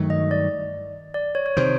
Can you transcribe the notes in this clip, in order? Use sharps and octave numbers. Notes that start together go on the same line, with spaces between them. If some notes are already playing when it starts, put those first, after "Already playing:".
Already playing: G2 D#3 F#3 A3
D#5
D5
D5
C#5
C#5
C3 D#3 C5